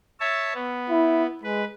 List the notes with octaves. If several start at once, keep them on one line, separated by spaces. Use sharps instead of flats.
C#5 E5 A5
B3
E4
G#3 B4